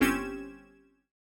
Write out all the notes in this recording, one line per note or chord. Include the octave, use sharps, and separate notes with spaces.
G1 C4 C#4 G4 G#6 E7